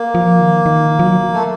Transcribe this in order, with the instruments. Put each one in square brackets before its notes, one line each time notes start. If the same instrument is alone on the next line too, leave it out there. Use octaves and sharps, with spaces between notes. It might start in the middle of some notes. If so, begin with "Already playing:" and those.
Already playing: [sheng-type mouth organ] A#3
[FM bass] F3
D#3
D#3
F3
F#3
[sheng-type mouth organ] A3